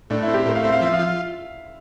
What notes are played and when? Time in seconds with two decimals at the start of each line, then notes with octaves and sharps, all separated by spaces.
0.10 A2 D4
0.23 E4
0.28 C4
0.34 G4
0.46 A2 A#4
0.55 F5
0.63 C4 E5
0.73 F5
0.81 F3 E5
0.93 F5
0.99 F4